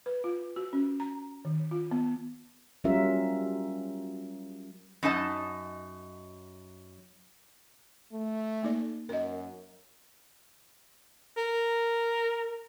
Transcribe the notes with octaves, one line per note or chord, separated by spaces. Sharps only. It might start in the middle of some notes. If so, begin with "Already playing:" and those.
B4
F4
F#4
C#4
A#5
D#3
F4
B3
F#3 G3 C#4 F4 A#4 E5
F#2 D#4 D#5 A5
A3
A#3 D#4 D5
F#2 A#4 D#5
A#4